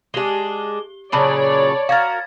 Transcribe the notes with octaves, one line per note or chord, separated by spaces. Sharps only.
G#3 D4 G4 G7
A#2 C#3 F#3 C#5 D5 A5 B5 F#7
F#4 A#4 F5 G#6 A6